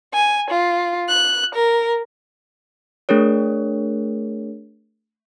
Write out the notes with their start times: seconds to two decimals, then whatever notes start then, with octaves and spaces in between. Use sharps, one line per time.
0.13 G#5
0.50 F4
1.09 F#6
1.56 A#4
3.09 A3 D4 G#4 A#4 C#5